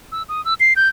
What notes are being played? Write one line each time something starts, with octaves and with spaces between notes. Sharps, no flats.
E6
D#6
E6
C7
G6